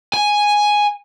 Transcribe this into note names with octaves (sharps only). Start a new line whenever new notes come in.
G#5